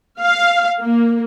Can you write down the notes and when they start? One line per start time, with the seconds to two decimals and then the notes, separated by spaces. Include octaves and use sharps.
0.20 F5
0.81 A#3